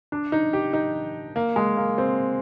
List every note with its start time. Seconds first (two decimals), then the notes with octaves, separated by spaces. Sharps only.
0.12 D4
0.32 D#4
0.53 G4
0.73 D#4
1.36 A#3
1.56 G#3
1.77 A#3
1.98 C4